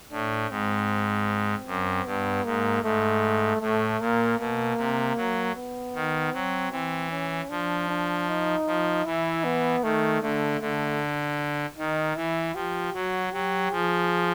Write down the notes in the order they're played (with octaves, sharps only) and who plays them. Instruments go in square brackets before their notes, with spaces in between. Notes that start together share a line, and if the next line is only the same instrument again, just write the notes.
[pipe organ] A2 [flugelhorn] D4
[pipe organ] G#2 [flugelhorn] C4
[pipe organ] F#2
[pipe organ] G2 [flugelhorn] B3
[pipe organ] G#2 [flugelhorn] A#3
[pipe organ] G#2 [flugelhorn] A3
[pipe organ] A2 [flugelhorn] A3
[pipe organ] A#2 [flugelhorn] A#3
[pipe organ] B2 [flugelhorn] A#3
[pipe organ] C3
F#3
[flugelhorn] B3
[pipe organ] D#3
[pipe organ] F#3 [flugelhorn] C4
[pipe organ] E3 [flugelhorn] C4
[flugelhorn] C#4
[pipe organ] F3 [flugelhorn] D4
[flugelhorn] D4
D#4
[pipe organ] F3
[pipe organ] E3 [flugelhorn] E4
[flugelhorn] B3
[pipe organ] D#3 [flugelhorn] A3
[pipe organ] D3 [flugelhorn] A3
[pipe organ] D3 [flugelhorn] A3
[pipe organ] D#3 [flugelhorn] D#4
[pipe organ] E3 [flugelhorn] E4
[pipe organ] F3 [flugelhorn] G4
[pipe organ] F#3 [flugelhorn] F#4
[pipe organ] F#3 [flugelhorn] G4
[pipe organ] F3 [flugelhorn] G#4